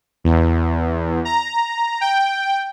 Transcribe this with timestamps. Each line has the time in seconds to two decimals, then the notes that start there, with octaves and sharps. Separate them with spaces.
0.24 E2
1.25 A#5
2.01 G5